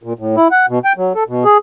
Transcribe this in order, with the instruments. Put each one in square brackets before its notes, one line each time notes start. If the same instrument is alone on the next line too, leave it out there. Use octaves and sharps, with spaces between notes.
[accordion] A#2
A2
E4
F#5
B2
G5
F#3
A4
B2
G#4